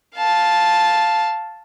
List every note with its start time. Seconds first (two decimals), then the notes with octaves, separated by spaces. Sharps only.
0.16 F5 A5